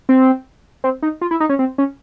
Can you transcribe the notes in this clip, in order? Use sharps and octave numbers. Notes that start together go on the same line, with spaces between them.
C4
C4
D#4
F4
E4
D#4
C#4
C4
C#4